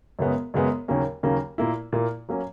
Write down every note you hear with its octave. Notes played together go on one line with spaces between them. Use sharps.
F#2 C#3 G#3 B3
F#2 C#3 G#3 B3
D#2 C#3 F#3 A#3 C#4
D#2 C#3 F#3 A#3 C#4
A#2 A#3 E4
A#2 A#3 E4
F#3 A#3 C#4